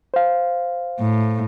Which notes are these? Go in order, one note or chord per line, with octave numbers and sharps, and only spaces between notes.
C5 F5
A2